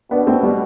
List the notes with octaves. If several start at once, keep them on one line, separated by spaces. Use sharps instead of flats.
B2 B3 D4
A3 C4
G3 B3